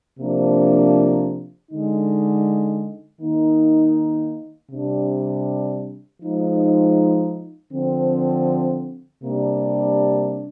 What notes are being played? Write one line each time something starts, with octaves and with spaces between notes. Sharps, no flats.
C3 F3 A#3 D4
D3 G#3 D#4
D#3 A#3 D#4
C3 G3 D4
F3 G#3 D#4
D3 F3 C4
C3 G3 A#3 D4